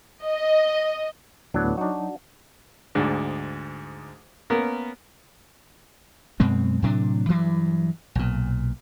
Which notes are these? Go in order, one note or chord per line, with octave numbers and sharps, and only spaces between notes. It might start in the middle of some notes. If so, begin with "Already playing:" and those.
D#5
D2 A2 E3 F#3 B3 D4
F#3 D4 D#4 F#4
D2 G#2 D4
A#3 B3 C#4 A#4
F#2 B2 G#3 C4
A2 C3 F#3 D4
G2 E3 F#3
B1 A#2